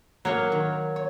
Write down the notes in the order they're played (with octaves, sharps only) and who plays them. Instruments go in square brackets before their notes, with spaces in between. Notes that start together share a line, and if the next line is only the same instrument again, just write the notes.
[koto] F#3 C#5 [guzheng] A#3 F5
[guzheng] D#3
C#5